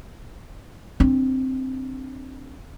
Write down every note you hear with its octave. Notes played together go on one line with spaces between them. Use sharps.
C4 D4